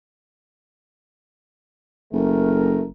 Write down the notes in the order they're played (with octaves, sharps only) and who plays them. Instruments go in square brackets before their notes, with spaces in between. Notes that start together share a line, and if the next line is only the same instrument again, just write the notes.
[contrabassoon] F#1 [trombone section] A3 A#4